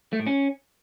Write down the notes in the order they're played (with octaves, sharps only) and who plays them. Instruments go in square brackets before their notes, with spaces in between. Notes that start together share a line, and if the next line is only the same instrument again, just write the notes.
[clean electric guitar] A3
A2
C#4